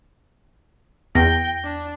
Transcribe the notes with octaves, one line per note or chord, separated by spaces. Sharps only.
E2 G5 A#6
D4